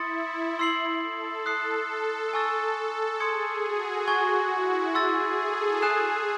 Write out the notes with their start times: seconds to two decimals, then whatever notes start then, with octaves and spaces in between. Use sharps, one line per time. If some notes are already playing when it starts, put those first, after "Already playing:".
Already playing: E4 C6 D#6 A6 C#7
0.59 C6 E6 C7 F#7
1.02 A4
1.46 D#6 F#6 C7
1.89 A4
2.33 A4 G#5 C#6 E6 A6
3.20 G#4 C6 D#6 G#6 C#7
3.64 F#4
4.08 G#5 C#6 G#6
4.52 E4
4.95 G#4 C6 E6 A6
5.39 A4
5.82 G#4 G#5 D#6 F#6 C7 E7